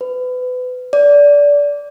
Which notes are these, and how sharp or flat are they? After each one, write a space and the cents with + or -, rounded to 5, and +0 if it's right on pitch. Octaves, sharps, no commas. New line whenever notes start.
B4 +30
D5 -20